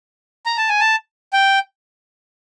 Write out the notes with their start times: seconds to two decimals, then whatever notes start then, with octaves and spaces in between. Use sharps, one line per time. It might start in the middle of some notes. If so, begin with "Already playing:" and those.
0.46 A#5
0.57 A5
0.69 G#5
0.80 A5
1.33 G5